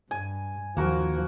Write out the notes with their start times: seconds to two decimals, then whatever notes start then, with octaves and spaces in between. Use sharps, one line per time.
0.11 G2 G#5
0.77 D#2 F3 A#3 F#4 A#4